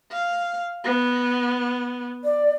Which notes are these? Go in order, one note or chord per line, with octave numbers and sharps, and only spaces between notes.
F5
B3
D5